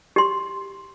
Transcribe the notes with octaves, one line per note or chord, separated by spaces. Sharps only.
G4 C6